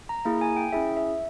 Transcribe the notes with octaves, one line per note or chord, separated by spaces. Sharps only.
A#5
A#3 E4 G#4 A#5
G#5
G5
C#4 E4 G#4 E5
E5